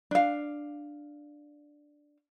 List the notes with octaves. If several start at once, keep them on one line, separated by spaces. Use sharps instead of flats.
D4 F5